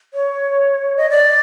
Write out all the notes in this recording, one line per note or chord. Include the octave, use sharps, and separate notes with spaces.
C#5
D#5
D5